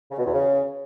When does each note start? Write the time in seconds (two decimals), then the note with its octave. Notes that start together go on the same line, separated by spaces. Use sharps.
0.11 C#3
0.18 B2
0.26 E2
0.33 C#3